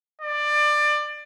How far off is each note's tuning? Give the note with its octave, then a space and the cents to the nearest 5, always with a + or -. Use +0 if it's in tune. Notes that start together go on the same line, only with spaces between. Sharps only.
D5 +20